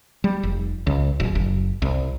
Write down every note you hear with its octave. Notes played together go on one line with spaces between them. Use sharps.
G3
F1
C#2
D1
F#1
C2